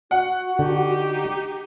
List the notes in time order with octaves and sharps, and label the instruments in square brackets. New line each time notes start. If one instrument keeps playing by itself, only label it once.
[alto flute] F#4 [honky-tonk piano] F#5
[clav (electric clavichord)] D3 [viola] D#4 G4